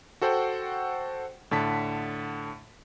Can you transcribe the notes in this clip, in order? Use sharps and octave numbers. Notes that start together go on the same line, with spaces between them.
F#4 A4 C5 F#5 G5
A2 D3 A5 B6